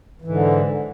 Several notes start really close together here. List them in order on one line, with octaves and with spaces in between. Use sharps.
E3 G#2 D3